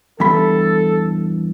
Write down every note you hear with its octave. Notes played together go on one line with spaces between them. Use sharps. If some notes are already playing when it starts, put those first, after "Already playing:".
E2 G2 A4 B5